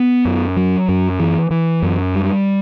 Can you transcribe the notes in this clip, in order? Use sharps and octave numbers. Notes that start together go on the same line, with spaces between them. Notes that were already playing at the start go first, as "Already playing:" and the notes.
Already playing: B3
F#2
F#3
F#2
E3
E3
F#2
G3